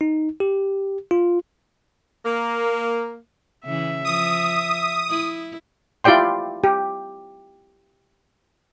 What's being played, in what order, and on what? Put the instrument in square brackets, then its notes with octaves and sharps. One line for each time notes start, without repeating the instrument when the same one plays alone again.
[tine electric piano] D#4
G4
F4
[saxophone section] A#3
[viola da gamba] C#3 E3 [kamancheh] E5
[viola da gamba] F3 [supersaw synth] D#6
[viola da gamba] E4
[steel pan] E4 F4 G4 D5 G5 C6
G4